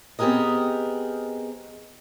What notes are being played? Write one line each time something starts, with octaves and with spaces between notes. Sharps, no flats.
B3 C4 G4 G#4 A#4 D#5